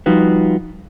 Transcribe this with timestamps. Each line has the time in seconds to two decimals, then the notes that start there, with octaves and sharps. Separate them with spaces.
0.06 F3 G3 D#4 F4 F#4 B4